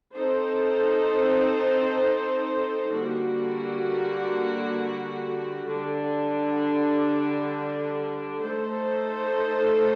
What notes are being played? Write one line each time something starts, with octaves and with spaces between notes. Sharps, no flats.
C4 D#4 A4 C5
D3 G3 A#3 F#4
D3 G3 D4
A3 D#4 A4 C5